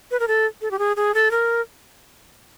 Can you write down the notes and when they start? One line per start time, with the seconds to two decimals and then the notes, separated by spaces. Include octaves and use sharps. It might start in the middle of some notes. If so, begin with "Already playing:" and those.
0.11 B4
0.20 A#4
0.28 A4
0.61 A4
0.71 G4
0.79 G#4
0.96 G#4
1.14 A4
1.31 A#4